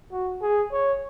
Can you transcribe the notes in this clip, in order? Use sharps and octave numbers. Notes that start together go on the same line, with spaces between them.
F#4
G#4
C#5